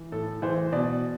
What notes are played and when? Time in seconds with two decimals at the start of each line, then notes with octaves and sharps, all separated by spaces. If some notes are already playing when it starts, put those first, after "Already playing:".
Already playing: E3
0.12 A2 A4
0.42 E3 C5
0.72 B2 D5